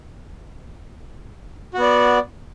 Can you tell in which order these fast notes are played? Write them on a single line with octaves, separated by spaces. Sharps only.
F#4 B3 D5